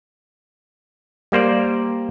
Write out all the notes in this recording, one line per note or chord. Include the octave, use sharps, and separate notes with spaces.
G3 A#3 C5 D5